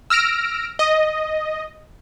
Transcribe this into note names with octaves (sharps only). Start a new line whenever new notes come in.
E6 F6 A#6 D7
D#5